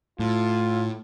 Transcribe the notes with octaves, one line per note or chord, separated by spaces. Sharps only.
A2 F4